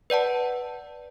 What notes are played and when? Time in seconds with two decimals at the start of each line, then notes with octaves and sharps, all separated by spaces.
0.10 B4 D5 F#5 A5